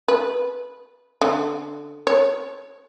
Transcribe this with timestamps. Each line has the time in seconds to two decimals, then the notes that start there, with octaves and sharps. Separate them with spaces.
0.08 B4
1.21 D3
2.07 C#5